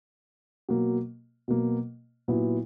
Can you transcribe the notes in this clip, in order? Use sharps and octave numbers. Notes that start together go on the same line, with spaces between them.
B2 F#3 A#3
B2 F#3 A#3
A#2 F#3 B3 E4